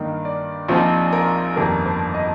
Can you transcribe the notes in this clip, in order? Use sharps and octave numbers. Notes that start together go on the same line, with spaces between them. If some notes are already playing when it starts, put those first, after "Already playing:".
Already playing: G2 D#3 A#3 D#4
D5
A#1 A#2 F3 C4 D#4 C5
A#4
G1 F2 D#3 G3 A#3 A#4
C5
D#5